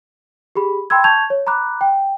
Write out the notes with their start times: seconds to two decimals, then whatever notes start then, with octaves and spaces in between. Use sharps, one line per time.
0.55 G4 G#4 B5
0.90 G5 B5 C6 E6 G#6
1.04 A5 C#6 G6 G#6 F7
1.30 C#5
1.47 A#5 B5 D6 F#6
1.81 G5